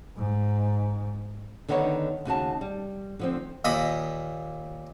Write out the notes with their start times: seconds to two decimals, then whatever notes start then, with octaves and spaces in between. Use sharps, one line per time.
0.17 G#2
1.69 D3 D#3 B3 D#4 C5 C#5
2.25 D#2 C#3 F#4 A5
2.61 G3
3.19 D3 F3 C4
3.65 D#2 A#2 D#5 B5